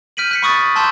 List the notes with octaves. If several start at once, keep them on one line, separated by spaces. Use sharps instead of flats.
F6 G6 B6 D7 D#7 F#7
F#6 B6 C#7
B5 C#6 D#6 A6
A5 B5 C6 E6 G6 E7